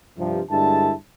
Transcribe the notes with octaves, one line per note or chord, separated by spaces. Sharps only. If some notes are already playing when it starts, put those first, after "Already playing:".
G2 C3 F3
G2 D3 G#3 E4 A5